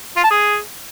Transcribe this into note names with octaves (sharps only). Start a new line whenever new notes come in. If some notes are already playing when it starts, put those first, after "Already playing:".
F4
A5
G#4